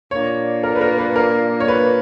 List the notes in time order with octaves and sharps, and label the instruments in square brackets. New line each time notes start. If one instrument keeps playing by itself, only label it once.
[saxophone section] A#2 A#3 D4 [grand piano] C#5
[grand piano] A#4
B4
A#4
B4
A#4
C#5
B4